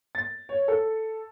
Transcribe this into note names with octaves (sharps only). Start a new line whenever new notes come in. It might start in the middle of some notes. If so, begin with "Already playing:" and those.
A6
C#5
A4